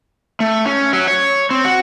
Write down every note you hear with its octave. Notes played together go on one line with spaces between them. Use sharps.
A3
C#4
F#3
C#5
C4
F#4